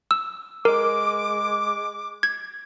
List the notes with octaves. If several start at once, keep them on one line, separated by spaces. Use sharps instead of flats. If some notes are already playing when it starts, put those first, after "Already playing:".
E6
G#3 A#4 D6
G#6